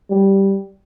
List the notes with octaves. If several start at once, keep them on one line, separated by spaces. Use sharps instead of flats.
G3